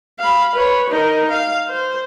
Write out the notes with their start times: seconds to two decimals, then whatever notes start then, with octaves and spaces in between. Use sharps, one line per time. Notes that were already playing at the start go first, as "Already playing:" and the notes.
0.19 F5 B5
0.55 B4 C#5
0.90 D#4 A#4
1.30 F5
1.69 C5